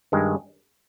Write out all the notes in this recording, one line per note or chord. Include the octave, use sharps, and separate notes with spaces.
G2 D#3 G#3